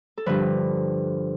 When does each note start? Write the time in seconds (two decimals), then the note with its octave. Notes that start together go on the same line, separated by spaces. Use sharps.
0.17 A4
0.26 G2 D3 F3 B4